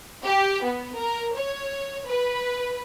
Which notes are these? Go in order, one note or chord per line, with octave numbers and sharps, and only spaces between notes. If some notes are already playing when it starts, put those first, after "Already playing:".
G4
B3
A#4
C#5
B4